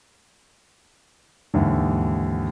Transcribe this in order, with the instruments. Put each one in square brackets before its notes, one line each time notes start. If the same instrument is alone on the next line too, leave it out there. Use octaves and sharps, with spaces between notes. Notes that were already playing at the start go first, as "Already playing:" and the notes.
[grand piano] D#2 G#2 D3 E3